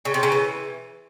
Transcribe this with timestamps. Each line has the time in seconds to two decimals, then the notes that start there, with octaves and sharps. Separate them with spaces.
0.05 C#3
0.14 C3
0.23 C#3
0.32 E3